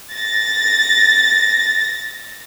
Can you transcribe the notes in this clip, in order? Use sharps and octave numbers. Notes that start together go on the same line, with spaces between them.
A6 A#6